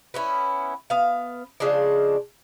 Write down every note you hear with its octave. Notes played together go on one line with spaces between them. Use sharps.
B3 C#4 E4
B3 F5
C#3 F3 G#3 D4